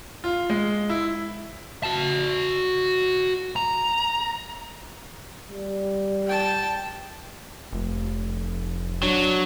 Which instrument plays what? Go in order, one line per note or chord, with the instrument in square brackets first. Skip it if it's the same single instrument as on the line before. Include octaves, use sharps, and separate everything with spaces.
[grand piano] F4
G#3
E4
[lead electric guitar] F#4 A5
A#5
[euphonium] G3
[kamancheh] G5 A5
[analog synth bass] F1
[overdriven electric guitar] F#3 [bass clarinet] D4